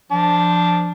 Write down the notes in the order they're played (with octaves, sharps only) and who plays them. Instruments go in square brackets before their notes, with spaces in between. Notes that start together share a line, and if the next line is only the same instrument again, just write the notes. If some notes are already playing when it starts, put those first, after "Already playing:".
[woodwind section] F3 [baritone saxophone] D4